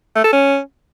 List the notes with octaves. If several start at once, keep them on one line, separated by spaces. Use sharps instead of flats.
A3
A4
C#4